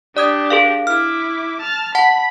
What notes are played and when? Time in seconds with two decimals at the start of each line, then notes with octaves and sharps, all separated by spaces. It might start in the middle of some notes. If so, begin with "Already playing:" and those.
0.17 D4 G4 D5 D#6 G#6
0.50 G#4 A#4 F5
0.87 E4 D6 F6
1.61 A5 F6
1.95 F#5 A5 B5 B6